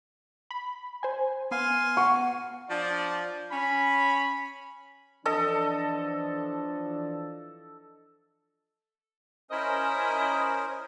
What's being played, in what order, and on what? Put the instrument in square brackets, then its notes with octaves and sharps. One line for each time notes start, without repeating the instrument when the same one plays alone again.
[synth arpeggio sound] B5
C5 G#5
[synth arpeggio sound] B3 [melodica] F5 G#5 C6
[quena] F#5 [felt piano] C#6
[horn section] F3 D4 D5
C#4 B5
[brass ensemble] E3 F3 D4 [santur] A4 D#5
[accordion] C#4 A#4 C5 [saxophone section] E4 D#5